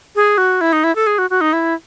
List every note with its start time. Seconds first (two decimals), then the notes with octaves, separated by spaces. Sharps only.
0.16 G#4
0.38 F#4
0.61 E4
0.73 D#4
0.84 E4
0.95 A4
1.07 G#4
1.18 F#4
1.30 F#4
1.41 D#4
1.53 E4